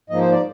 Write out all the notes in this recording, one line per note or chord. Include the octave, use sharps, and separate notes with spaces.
G#2 F3 A#3 D#5
C5
D5